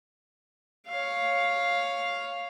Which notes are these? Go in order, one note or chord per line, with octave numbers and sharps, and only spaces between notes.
C#5 F5